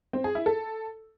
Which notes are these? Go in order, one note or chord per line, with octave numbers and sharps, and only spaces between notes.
C4
G#4
E4
A4